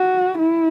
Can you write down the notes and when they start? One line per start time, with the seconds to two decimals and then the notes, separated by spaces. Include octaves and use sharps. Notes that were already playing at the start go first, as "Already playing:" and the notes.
Already playing: F#4
0.38 E4